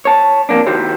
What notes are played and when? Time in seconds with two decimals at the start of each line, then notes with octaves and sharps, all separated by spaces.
0.05 C#5 A5
0.49 F2 A#3 D4
0.66 D#3 E4 F#4 G4 C5